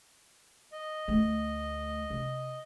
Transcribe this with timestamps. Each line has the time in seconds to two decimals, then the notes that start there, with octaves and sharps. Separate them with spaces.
0.72 D#5
1.08 D2 A3
2.10 C3